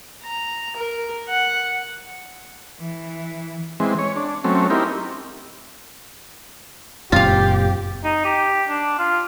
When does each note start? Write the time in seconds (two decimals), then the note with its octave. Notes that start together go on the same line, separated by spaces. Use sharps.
0.23 A#5
0.77 A#4
1.29 F#5
2.80 E3
3.80 E3 G#3 C4
3.99 C#5
4.16 D4
4.44 F#3 A3 C4 C#4
4.70 C4 D#4 E4 G4 A#4
7.12 F#1 F#2 A#2 C4 F4 G4 F5
8.04 D#4
8.25 G4
8.69 D4
8.98 F4